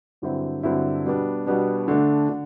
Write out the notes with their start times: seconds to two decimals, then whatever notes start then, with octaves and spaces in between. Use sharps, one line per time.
0.22 G2 D3 F#3 C4 E4
0.63 G2 D3 F#3 C4 E4
1.05 B2 G3 B3 D4
1.46 B2 G3 B3 D4
1.88 D3 A3 D4
2.29 D3